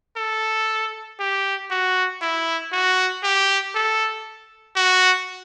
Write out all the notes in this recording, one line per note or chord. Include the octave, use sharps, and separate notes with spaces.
A4
G4
F#4
E4
F#4
G4
A4
F#4